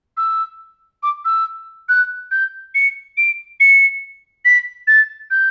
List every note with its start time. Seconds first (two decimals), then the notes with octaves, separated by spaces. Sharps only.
0.17 E6
1.03 D6
1.25 E6
1.89 F#6
2.31 G6
2.75 C#7
3.17 D7
3.60 C#7
4.45 B6
4.87 A6
5.31 G6